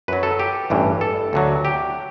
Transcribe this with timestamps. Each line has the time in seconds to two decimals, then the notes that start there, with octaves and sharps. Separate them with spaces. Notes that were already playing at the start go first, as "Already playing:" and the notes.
0.08 F#2 F#3 B4
0.23 A4
0.40 G4
0.70 A1 G2 E3
1.01 A4
1.33 D2 D3 F#3
1.65 G4